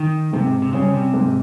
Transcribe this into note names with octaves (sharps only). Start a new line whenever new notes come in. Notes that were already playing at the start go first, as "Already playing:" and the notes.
Already playing: D#3
G#2 C3
C3
C#3 G3 C#4
C3
G#2